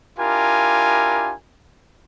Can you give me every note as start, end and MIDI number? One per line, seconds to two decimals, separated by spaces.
0.18 1.33 62
0.18 1.33 64
0.18 1.33 65
0.18 1.33 67
0.18 1.33 70
0.18 1.33 80